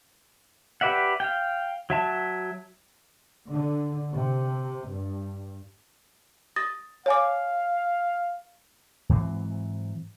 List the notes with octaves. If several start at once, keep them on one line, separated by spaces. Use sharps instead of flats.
G4 B4 D5 E5 F#5
F5 G5
F#3 E5 A5
D3
C3
G2
D#6 A6 A#6
C#5 F5 G#5 D6
G#2 E3 F#3 C4